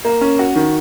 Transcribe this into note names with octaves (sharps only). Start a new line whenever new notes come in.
A#3
C#4
F#4
D#3